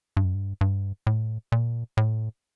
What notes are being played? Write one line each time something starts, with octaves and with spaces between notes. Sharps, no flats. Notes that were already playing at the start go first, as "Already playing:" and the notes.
G2
F#2
G2
G2
A2
A#2
A2